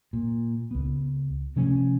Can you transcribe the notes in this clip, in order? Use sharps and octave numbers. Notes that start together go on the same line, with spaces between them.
A#2
C#2 B3
C3 F3 A3 C#4